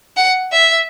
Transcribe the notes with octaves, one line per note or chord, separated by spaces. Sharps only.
F#5
E5